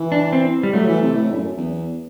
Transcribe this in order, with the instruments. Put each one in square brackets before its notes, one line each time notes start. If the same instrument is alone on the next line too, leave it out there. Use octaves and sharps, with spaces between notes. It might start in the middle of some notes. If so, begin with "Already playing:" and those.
Already playing: [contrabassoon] E3
[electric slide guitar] D4
C4
G3
[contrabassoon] F#3 [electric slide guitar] A3
[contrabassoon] E3
C3
A2
G2
F#2
E2